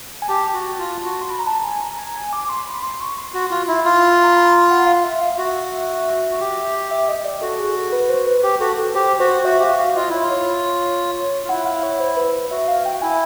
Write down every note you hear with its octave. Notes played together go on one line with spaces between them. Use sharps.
G#5
G4 A5
F#4
F4
F#4
C6
B5
A#5
A5
G#5
A#5
G#5
G#5
D6
C6
B5
C6
C#6
C6
F#4
F4
E4
F4
A#5
B5
A#5
F#5
F5
E5
F5
F#4 E5
F#4
G4
E5
D#5
D5
F#4 A4
G#4
A4
B4
C5
B4
G4
F#4 A4
A4
G4 C5
F#4 C5
F#4 E5
G4 F5
F#4
F5
F4 D#5
E4 C#5
F4
C#5
F4
E4 F#5
F5
C#5
C5
B4
F#4 E5
F5
G5
E4 G#5